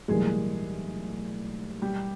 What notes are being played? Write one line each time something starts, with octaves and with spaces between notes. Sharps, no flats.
B1 A2 E3 G3 G#3 A#3 G#4
G3 G4